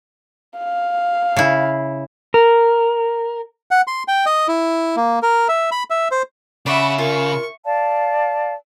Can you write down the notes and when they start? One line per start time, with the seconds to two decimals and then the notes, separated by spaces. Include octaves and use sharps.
0.57 F5
1.37 C#3 E4
2.34 A#4
3.71 F#5
3.87 C6
4.08 G5
4.26 D#5
4.48 E4
4.96 A#3
5.22 A#4
5.49 E5
5.72 B5
5.90 E5
6.11 C5
6.66 C#3 D5 E5 F#5 B5 C#6
6.98 F4 A#4 C#6
7.65 D5 F5 A5